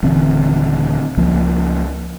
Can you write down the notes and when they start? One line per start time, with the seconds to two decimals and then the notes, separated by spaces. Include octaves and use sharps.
0.03 D#1 D3 E3 C4
1.17 C#2 F3 A#3